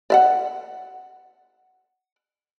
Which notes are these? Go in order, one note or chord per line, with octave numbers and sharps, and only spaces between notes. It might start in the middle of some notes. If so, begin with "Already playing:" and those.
D5 E5 F#5